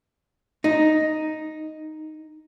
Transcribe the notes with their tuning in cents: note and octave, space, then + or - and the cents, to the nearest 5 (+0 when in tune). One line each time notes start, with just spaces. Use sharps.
D#4 +0